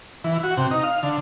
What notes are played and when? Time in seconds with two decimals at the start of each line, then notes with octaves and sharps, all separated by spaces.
0.24 E3
0.43 F#4
0.57 C3
0.71 D#4
0.83 F5
1.03 D3